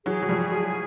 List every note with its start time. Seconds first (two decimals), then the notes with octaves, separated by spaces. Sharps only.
0.05 E3 F#3 G#4
0.22 F#3
0.29 F3 G3
0.52 F#3 G#3